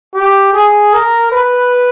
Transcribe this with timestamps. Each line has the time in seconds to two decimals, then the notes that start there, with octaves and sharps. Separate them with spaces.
0.15 G4
0.53 G#4
0.93 A#4
1.32 B4